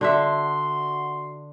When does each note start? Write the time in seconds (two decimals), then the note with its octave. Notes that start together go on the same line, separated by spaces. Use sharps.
0.01 D3 D4 F#4 E5 C6